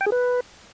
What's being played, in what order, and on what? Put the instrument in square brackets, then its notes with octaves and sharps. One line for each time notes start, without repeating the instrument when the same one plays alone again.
[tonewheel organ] G5
G#4
B4